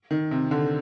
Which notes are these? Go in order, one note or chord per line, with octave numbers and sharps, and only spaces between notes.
D#3
C3
D3